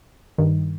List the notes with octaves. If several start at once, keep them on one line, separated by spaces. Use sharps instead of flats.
G2 D#3